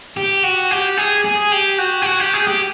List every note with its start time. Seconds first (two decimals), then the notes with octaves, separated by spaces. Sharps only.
0.17 G4
0.43 F#4
0.71 G4
0.97 G#4
1.24 G#4
1.52 G4
1.78 F#4
2.02 G4
2.06 F#4
2.20 G4
2.33 G#4
2.47 G4